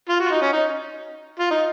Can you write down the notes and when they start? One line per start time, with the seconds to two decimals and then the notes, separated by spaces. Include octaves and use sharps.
0.09 F4
0.20 F#4
0.26 F4
0.31 D#4
0.42 C#4
0.53 D#4
1.39 F4
1.50 D#4